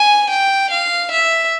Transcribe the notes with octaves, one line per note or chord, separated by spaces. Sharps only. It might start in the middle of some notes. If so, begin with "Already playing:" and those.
Already playing: G#5
G5
F5
E5